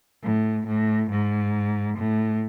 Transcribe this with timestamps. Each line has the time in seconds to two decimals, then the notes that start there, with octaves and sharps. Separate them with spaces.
0.23 A2
0.67 A2
1.11 G#2
1.97 A2